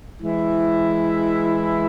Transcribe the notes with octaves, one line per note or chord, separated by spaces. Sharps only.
E3 G#3 E4